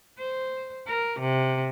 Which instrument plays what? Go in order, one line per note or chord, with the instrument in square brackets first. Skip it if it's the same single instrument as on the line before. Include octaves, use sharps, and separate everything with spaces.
[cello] C5
A#4
C3